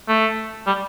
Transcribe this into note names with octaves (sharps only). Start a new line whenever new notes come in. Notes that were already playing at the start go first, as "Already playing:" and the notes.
A3
G3